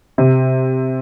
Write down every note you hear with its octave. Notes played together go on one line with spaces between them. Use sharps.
C3